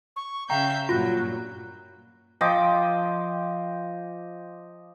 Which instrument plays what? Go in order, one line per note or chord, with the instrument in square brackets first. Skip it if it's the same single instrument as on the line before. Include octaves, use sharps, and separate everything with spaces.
[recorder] C#6
[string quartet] C#3 E5 G6 [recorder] F5 [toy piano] G5 [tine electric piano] A#5
[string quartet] G2 A#2 F#3 [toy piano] F4 [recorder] F#4
[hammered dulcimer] F3 D#5 G5 D6